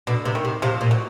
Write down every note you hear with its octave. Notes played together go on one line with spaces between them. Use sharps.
B2 D3
C3
D#3
C3
C3 F3
A#2
F#3